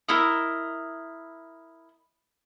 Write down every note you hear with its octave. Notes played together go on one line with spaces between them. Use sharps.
E4 A#4 D#5